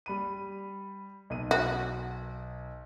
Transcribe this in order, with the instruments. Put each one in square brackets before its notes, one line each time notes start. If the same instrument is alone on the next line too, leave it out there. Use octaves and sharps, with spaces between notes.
[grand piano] G3 B5 D#7
B1 D#7
[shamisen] F#4